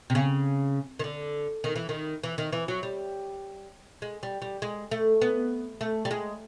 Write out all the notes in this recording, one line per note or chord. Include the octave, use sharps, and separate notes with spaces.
C3
C#3
D#3
D3
D#3
E3
D#3
E3
D#3
E3
F#3
G3
G#3
G3
G3
G#3
A3
B3
A3
G3
G#3